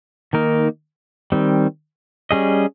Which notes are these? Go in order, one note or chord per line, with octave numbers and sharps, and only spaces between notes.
D#3 A#3 D#4 A#4
D#3 G3 C4
G3 C#4 G#4 D#5